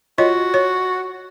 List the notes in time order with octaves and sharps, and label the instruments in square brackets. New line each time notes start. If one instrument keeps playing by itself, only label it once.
[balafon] F4 C#5 D#5 [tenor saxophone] F#4
[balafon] C#5